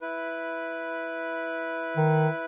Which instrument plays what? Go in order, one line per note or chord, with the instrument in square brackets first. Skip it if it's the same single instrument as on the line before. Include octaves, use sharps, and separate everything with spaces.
[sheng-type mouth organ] E4 B4
[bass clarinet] D#3